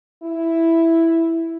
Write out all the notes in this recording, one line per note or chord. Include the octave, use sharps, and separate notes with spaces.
E4